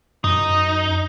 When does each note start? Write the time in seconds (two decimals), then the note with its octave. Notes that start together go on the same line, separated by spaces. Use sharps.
0.24 F#2 D#4